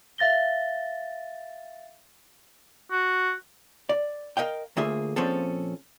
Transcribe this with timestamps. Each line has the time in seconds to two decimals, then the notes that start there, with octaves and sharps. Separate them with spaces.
0.18 E5 F5 A6 A#6 G7
2.91 F#4
3.89 D5
4.37 A#4 D#5 F5 G5
4.77 D2 A3 A#3 F4 G#4 E5
5.16 A#2 F3 C4 C#4 G#4 A4